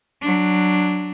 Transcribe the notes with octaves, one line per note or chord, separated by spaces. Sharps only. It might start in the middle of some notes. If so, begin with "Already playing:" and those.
F#3 D4